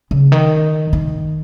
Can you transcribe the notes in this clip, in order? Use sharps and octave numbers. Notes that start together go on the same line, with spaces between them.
C#3
D#3
D#3